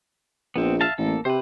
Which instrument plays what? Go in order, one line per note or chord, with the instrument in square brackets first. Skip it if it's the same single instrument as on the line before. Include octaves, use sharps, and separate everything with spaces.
[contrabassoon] A#1 [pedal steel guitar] B3 C4
[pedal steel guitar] E5 F5 A5
[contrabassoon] A1 [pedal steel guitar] A#3 A4
[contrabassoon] C3 [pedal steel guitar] B4 C5